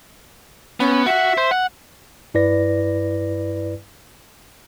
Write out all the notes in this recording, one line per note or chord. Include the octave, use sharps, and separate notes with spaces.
B3 C#4
F#4 E5 F#5
C5
F#5
G2 E4 B4 D5 A#6